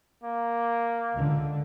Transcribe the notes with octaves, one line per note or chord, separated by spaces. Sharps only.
A#3
C#2 D3